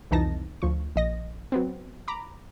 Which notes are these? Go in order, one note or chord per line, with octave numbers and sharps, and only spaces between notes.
C2 F2 E3 D#4 A5 A#6
D2 F3 C#6
A#1 D#5 A#6
F#3 B3 C4
A#5 B5 D6